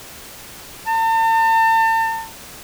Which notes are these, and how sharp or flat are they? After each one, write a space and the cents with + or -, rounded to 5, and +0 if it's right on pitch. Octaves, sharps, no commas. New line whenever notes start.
A5 +40